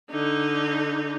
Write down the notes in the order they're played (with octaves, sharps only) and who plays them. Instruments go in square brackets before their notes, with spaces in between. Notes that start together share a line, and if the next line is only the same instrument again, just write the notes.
[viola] D3 D#4